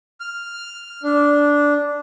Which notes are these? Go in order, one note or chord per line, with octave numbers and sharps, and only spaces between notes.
F6
D4